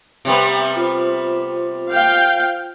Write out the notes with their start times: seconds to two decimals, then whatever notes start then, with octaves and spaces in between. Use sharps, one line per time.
0.25 C3 G3 B3
0.76 F4 C5
1.91 F5 G5